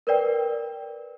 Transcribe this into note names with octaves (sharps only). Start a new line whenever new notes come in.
A#4 B4 D5 G5